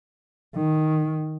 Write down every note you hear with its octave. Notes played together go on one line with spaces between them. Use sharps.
D#3